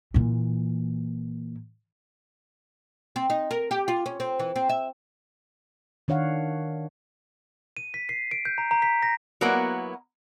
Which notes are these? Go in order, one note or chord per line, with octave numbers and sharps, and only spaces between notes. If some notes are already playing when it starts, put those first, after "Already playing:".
A#2 E3
C4
D#4
A#4
G4
F4
C#4
C4
E3
C4
E5
D#3 D4 C#5 F5 F#5
D#7
B6
C7
D7
G6
A#5
A#5
B6
A#6
F#3 A#3 B3 E4 A#4 F#5